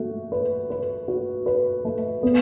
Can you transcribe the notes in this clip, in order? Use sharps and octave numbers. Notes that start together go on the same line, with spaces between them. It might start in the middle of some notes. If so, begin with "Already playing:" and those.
Already playing: A3 F#4
B4
B4
F#4
B4
A3
B3